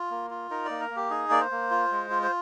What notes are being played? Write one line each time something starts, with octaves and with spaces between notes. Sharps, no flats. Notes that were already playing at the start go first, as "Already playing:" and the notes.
Already playing: F4
A#3
F4
D#4 A#4
A#3 D5
A#4
A#3
G4
D#4 G#4
A#3 D5
C5
A#3
F4
G#3
F4
C5